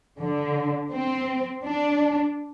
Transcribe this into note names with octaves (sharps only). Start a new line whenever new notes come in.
D3
C4
D4